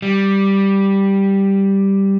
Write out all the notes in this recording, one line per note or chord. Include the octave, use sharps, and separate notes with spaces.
G3